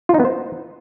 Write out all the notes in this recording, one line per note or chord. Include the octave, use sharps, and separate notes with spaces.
F4
D#4
B3
C5